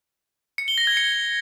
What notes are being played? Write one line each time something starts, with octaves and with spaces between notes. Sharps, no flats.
C#7
G7
A#6
G#6
C#7